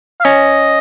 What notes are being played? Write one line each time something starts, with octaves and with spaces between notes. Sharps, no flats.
F5
C#4 D#5